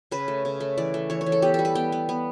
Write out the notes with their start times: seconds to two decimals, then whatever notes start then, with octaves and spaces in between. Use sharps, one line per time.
0.11 C#3 B4
0.28 A3
0.45 C#3
0.60 A3
0.78 E3 D5
0.94 A3
1.10 E3 C#5
1.21 C#5
1.26 E3
1.32 A4
1.42 B3 G4
1.54 G3 A4
1.65 B4
1.75 B3 G5
1.92 B3
2.09 B3